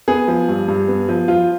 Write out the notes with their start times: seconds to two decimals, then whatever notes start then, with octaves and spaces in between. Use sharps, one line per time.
0.08 B3 G#4
0.28 F3
0.49 G2
0.68 G2
0.88 B3
1.09 F3
1.28 F3 F4